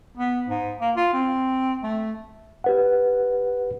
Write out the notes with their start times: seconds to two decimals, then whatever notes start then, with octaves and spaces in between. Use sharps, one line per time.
0.17 B3
0.49 G#2
0.81 A#3
0.96 F4
1.13 C4
1.83 A3
2.64 G4 B4 F#5